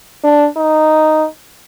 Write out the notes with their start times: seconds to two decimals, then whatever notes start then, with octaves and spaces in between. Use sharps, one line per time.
0.24 D4
0.56 D#4